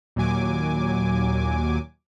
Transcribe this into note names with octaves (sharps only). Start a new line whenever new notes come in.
D#2 A#2 F#3 G#5 D6